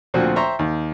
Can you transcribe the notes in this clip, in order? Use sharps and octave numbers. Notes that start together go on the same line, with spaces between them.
D2 A#2 F3 C4 F#4
C5 E5 G5 A#5 C6 C#6
D#2